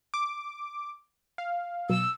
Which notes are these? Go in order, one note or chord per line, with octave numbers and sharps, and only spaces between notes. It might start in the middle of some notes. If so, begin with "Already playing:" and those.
D6
F5
B2 F#3 E6